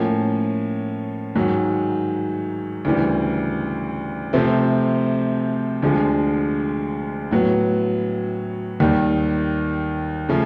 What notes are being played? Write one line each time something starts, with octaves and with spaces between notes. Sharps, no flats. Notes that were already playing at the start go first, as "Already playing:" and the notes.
Already playing: A2 F3 A#3 C#4
G#2 D#3 F#3
D2 C#3 E3 G3
C3 F3 A3 C4
D2 D3 F3 G#3
A2 F#3 B3
D#2 D#3 G3
C#3 F3 A3